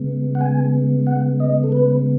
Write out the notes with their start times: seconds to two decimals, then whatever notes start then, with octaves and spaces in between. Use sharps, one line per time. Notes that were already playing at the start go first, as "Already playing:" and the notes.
Already playing: C#3 G#3 B3
0.35 F#5
0.41 G#5
1.07 F#5
1.40 D#5
1.64 A4
1.72 B4